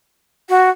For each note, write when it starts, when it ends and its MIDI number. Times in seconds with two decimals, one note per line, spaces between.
0.49 0.69 66